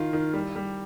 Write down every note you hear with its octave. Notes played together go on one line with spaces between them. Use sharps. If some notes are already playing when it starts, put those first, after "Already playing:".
Already playing: D#3 F4
D#3
G3
G3